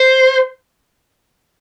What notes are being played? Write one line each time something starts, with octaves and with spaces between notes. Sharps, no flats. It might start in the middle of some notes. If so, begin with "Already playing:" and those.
Already playing: C5